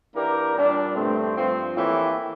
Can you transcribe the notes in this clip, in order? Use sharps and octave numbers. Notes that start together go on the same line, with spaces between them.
E3 A#3 D4 G4 A#4
A#2 G3 D4
G2 D3 A3 C4
G2 F3 C4
A2 E3 A#3 E4 G4